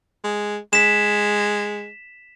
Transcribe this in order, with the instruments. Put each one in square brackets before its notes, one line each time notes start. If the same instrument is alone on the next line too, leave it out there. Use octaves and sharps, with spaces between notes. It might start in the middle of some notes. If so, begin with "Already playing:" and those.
[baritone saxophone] G#3
[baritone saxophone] G#3 [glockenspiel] B6 E7